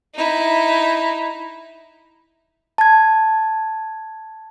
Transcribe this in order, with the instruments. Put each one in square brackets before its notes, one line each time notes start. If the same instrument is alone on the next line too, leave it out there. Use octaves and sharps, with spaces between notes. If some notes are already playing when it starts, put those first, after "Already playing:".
[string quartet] D#4 E4
[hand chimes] A5 G#6